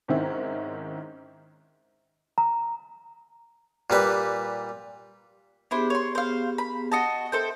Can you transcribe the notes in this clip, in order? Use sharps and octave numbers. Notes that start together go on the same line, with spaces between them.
G#2 D#3 C4 C#4 E4
A#5
A#2 G3 B4
B3 D4 E4 G4 G#4 C5
C#5 C6
C5 F5
B5
F#4 D#5 A5
A4 C5 E5 G5